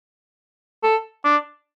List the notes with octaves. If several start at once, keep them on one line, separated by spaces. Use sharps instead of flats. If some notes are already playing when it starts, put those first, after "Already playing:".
A4
D4